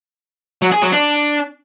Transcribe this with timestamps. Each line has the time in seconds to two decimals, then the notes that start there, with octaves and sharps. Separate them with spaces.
0.62 F#3
0.72 G#4
0.82 F#3
0.92 D4